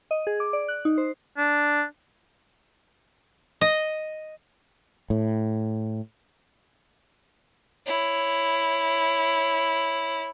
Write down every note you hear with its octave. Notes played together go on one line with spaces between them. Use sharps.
D#5
G#4
D6
D5
F#6
D#4
C5
D4
D#5
A2
E4 C#5